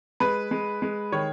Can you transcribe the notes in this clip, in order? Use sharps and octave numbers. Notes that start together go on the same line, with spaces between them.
G#3 B4
G#3
G#3
D#3 C#5